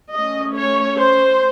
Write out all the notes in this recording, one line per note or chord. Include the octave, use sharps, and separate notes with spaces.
A3 C#4 D#5
C#5
C5